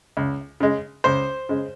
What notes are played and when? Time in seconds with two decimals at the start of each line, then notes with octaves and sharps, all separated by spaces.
0.17 C#2
0.60 C#3 G#3
1.04 C#2 C5
1.49 C#3 G#3